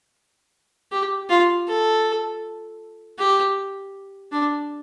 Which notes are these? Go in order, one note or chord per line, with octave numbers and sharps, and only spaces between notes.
G4
F4
A4
G4
D4